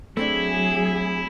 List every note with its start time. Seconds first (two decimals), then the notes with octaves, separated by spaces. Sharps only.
0.17 F#3 A3 C4 D4 E4 G#4